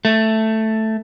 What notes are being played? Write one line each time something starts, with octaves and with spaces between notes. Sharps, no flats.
A3